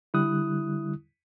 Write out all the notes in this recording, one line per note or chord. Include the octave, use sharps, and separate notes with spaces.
D3 G3 E4 D#6 F#6